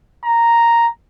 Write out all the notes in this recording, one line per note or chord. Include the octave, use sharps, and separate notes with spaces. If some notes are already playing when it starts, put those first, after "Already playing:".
A#5